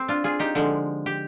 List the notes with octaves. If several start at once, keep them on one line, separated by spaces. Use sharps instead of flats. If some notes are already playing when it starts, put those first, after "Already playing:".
Already playing: C4
D4 F4
F4 G#4
D#4 G4
D3 F3 G#3
G4